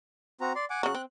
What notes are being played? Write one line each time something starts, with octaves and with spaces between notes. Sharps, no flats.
C4 F#4 A#5
D5 C6
F#5 G#5 D6
C#3 F#3 F#6
C4